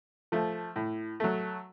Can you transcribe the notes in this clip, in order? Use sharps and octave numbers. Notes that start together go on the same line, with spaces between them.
F3 A3
A2
F#3 A3